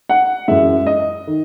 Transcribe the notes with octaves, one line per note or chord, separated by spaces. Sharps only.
F#5
F#2 E3 G#3 E5
D#5
D#3